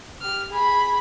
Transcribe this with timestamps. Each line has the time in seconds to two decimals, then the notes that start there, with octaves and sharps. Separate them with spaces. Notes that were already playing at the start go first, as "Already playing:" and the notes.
0.21 G4 F6
0.50 G#4 B5